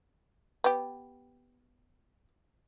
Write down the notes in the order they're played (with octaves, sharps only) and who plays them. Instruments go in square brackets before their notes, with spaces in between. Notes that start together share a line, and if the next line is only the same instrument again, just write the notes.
[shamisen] B3 G4